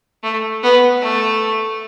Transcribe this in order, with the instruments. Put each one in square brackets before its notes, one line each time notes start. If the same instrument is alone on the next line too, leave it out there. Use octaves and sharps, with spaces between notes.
[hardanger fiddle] A3
B3
A3